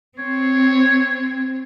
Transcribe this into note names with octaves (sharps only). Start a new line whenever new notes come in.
C4 C#5